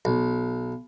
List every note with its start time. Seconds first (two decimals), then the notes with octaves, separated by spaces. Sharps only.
0.05 B1